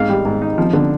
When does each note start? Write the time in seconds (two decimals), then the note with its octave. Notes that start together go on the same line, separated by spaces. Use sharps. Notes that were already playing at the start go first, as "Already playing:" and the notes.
Already playing: G#2 F5
0.09 G3
0.25 G#2
0.42 D#4
0.58 F3
0.73 D3